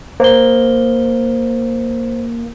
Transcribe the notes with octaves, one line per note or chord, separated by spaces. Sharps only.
A#3 C5 G7